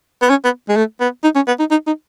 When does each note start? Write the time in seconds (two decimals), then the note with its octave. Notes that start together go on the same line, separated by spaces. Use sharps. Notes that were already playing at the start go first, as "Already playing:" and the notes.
0.22 B3
0.30 C#4
0.45 B3
0.69 G#3
0.76 A3
1.00 B3
1.23 D#4
1.35 C#4
1.47 B3
1.59 D#4
1.71 D#4
1.87 D#4